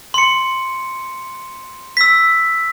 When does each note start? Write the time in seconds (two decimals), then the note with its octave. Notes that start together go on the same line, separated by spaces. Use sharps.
0.14 C6 C#7
1.97 E6 B6